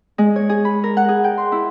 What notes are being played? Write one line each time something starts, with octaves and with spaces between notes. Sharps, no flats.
G#3
C#5
G#4
B5
A#4
F#5
G#4
G5
C6
E4